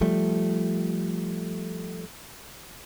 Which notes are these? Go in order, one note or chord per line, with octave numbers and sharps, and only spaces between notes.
F3 G3 A3